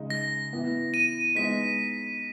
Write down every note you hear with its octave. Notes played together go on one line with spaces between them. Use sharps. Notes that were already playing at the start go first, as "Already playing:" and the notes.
Already playing: C#3 G#3 D#4
A#6
E3 B3 E4
D#7
G#3 B3 D#4 B6